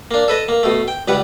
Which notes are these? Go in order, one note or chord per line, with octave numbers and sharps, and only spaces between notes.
A#3 D4
A4 B4 D#5
A#3
B2 A3
G5
C#2 G3 B4 F#5